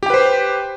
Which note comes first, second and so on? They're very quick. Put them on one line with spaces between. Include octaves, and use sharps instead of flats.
G4 G5 B4 C5